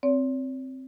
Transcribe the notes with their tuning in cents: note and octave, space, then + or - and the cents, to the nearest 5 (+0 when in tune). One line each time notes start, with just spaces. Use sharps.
C4 +5 C#5 +40